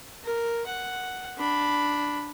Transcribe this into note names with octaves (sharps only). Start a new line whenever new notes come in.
A#4
F#5
D4 B5